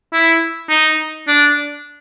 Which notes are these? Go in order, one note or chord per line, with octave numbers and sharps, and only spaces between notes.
E4
D#4
D4